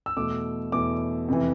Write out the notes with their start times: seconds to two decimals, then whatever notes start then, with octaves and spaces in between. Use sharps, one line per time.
0.06 E6
0.17 E2 B2 A3 D6
0.72 E2 B2 A3 D6
1.28 F2 C3 E3